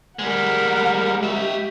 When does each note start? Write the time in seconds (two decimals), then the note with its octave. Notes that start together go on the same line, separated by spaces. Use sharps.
0.19 G3 G#3 A#4 F#5
1.23 G#3 G4 E5